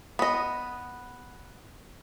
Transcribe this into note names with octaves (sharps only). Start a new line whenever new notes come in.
B3 D#5